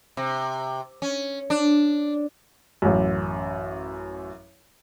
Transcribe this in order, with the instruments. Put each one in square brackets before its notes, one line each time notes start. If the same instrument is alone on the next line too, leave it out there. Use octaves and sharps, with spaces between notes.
[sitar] C3
C#4
D4
[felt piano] A1 F#2